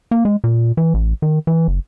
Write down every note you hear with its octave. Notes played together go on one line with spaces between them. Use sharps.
A#3
G#3
A#2
E3
A1
D#3
E3
F#1